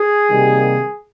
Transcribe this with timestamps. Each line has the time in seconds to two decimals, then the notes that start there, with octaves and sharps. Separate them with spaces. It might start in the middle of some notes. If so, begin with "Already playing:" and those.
Already playing: G#4
0.30 C3 D#3 G3 A#3